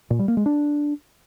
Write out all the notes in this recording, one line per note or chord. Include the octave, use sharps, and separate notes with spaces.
A#2
G3
A#3
G#3
D4